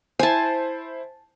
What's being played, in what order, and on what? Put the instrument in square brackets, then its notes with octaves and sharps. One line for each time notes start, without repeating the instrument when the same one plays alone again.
[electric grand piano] E4 C5 [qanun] G#5 A5